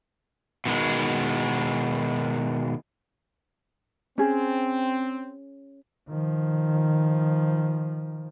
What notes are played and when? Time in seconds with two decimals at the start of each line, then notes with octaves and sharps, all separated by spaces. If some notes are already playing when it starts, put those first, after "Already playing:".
0.65 B2 D#3 G#3
4.18 C4 C#4 G#4
6.09 D#3 F3